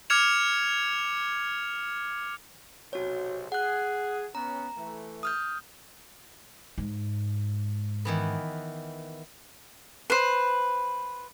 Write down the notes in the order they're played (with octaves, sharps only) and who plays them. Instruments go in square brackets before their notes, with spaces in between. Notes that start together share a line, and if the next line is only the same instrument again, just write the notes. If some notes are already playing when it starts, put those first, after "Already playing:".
[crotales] D6 F6 G#6 C#7 E7 F7
[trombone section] B1 C3 [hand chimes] F#4 C#5
[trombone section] G#4 [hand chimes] F#5 F#6
[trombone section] B3 C#4 [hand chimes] A#5
[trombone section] E3 A3
[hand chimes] D#6 F6 G6
[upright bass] G#2
[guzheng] D#3 E3 B3
[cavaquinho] B4 C5